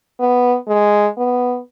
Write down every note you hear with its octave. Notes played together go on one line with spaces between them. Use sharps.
B3
G#3
B3